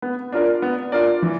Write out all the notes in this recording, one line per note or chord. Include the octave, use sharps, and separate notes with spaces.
B3
D4 F4 A#4 D5
B3
D4 F4 A#4 D5
E3